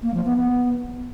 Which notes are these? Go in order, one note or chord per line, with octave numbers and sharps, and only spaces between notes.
A#3
F3
B3
B3